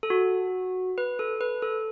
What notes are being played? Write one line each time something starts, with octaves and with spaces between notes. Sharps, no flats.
A4
F#4
B4
A4
B4
A4